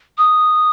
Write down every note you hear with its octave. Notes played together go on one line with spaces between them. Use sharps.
D#6